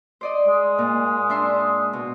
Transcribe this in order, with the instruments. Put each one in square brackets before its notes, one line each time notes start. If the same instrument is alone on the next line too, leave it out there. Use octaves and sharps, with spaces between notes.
[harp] C5 D5 D#5
[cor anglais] G#3
[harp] A#2
D4 E5 C6
B2